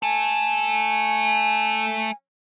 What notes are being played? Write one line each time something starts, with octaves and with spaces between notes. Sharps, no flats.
A3 A4 G#5